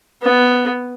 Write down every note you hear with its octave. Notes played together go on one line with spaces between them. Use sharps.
B3